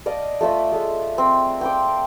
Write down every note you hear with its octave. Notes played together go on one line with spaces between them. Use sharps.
D5 D#5 F5 A5
A3 F4 A4 E5
G#3 A3
C4
G5 C6 D6